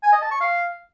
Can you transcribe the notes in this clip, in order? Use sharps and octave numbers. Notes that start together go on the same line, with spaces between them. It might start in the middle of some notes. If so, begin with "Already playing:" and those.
G#5
D#5
A5
C#6
F5